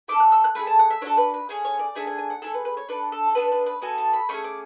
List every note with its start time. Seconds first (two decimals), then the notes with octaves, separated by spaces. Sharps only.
0.08 A3 C#4 A4 D6
0.20 F#6
0.32 E6
0.44 F#6
0.55 A3 E4 B5
0.59 G#4
0.67 A5
0.79 F#5
0.90 E5
1.01 D4 C#5
1.05 F#4 A4
1.17 B4
1.34 B4
1.49 A3 C#4 G#4 C#5
1.65 C#5
1.79 D5
1.95 A3 D4 G#4 E5
2.07 G#5
2.18 G#5
2.30 F#5
2.42 A3 E4 G#4 A4
2.54 B4
2.65 B4
2.77 C#5
2.89 D4 A4 B4
3.12 A4
3.35 B3 D4 A4 B4
3.52 B4
3.66 B4
3.82 B3 F#4 A4 G#5
3.98 A5
4.13 B5
4.29 A3 C#4 G#4 C#6
4.44 D6